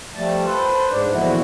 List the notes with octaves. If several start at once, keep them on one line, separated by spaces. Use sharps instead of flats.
F3 G3 A3 A5
A4 B4 C5
G#2 D4
E2 A#2 D3 F3 E4 F#4